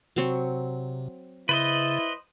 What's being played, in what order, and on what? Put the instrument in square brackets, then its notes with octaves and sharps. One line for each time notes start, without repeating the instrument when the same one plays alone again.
[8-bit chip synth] C3 [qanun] F#3 C4 C#6
[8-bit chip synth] C#3 A6 [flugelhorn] E4 [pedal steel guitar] B4 C5 D#5